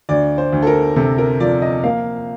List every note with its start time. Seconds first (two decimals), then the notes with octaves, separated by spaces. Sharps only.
0.09 D2 D5
0.38 C5
0.52 D2
0.62 A4
0.67 A#4
0.96 C3 A4
1.18 A#4
1.40 F3 D5
1.62 D#5
1.84 A#3 F5